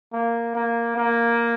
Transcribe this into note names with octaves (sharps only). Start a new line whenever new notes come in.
A#3
A#3
A#3